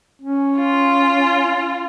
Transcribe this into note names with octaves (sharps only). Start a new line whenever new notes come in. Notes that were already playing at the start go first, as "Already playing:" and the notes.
C#4
F4